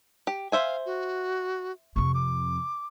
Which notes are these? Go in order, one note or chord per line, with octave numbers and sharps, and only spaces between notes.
G4
C5 E5 F5 G#5
F#4
F2 C3 C#6
D6